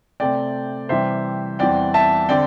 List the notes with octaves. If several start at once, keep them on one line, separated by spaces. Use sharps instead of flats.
C3 A3 C4 D5 G5
C3 E3 G3 C5 E5
E2 E3 G3 C4 D5 G5
E5 A5
D3 C4 D5 G5